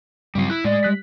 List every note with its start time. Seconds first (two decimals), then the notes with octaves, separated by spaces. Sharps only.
0.35 G2 C#3 F#3 G3 C4
0.50 E4 F#6
0.65 A2 G#3 D5
0.83 G3 F#6 B6